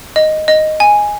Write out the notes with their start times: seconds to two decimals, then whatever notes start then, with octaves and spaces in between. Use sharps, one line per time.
0.16 D#5
0.48 D#5
0.80 G#5